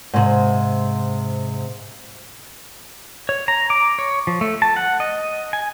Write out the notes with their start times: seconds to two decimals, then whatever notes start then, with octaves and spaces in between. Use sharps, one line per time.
0.13 G#2 C3
3.29 C#5
3.48 A#5
3.70 D6
3.99 C#5
4.27 F3
4.41 A3
4.62 A5
4.76 F#5
5.00 D#5
5.53 G#5